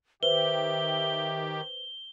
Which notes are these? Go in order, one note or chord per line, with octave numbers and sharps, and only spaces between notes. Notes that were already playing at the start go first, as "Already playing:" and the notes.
D#3 G4 B4 C5 E5 G7